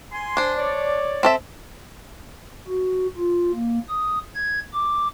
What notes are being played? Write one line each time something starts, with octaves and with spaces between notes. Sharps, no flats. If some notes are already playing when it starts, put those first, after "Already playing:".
G#5 C6
D4 C5
C#5 D5
C4 A4 E5
F#4
F4
A#3
D#6
G#6
D6